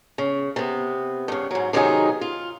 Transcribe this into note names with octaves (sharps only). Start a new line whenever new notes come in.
C#3
C3 B3
G2 C#3
G#2 F#3
C3 D#3 F#3 B3 D#4 G#4
F4